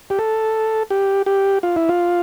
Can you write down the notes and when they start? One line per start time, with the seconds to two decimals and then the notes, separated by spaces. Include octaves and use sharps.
0.10 G4
0.19 A4
0.90 G4
1.26 G4
1.63 F4
1.76 E4
1.89 F4